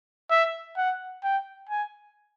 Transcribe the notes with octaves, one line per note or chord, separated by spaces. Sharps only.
E5
F#5
G5
G#5